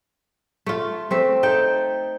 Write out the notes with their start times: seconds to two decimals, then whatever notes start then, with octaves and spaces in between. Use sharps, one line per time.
0.66 A3 F4
1.11 A3 C4 E5
1.43 D#4 A4 G5